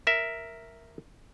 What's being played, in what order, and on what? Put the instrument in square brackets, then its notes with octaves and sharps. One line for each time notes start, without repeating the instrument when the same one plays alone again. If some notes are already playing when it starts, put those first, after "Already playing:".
[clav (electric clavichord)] A#4 E5